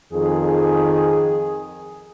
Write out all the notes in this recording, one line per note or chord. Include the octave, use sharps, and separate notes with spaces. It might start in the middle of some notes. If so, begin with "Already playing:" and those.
F2 D#3 G#4